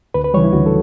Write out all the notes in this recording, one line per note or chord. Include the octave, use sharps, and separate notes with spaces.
D2 B4
B4
C#3 E3 G3 C#5
E4
D2 F#4
A4